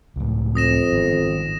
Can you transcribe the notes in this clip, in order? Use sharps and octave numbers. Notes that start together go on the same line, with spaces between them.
C#2 A2
F2 D#6 A#6 E7
G#1 D#3 B3